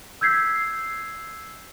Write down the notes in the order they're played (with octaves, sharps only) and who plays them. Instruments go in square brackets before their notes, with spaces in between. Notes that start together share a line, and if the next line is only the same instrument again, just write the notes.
[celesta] E6 G6 G#6 B6 C7